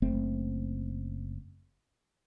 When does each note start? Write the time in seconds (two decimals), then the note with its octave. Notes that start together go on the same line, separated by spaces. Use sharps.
0.02 F#1 A3 C4